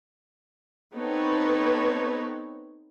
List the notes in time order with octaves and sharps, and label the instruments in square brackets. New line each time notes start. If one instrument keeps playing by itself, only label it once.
[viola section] B3 C4 D#4 A4 B4 C#5